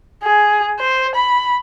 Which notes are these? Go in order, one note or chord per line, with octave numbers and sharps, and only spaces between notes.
G#4
C5
B5